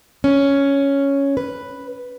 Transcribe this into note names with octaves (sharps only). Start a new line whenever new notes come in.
C#4
B4